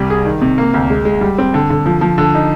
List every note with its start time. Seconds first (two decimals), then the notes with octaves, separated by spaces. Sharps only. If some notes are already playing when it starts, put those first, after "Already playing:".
Already playing: C2 G3
0.10 G#4
0.25 D#3
0.41 C3
0.58 A#3
0.74 D2
0.90 G#3
1.05 G#3
1.21 G3
1.38 C4
1.54 D3
1.70 D3
1.86 F3
2.01 F3
2.18 D3
2.34 D#4